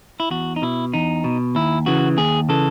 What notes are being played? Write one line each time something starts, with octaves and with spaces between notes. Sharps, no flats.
E4
E2 F#4
D#4
B2 E4
E2 D#4
B2
D#2 E4
C#3 E3 F#4
D#2 G#4
C#3 E3 A4